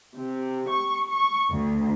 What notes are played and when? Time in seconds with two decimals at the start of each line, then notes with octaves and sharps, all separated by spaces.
0.16 C3
0.70 C#6
1.09 C#6
1.51 D2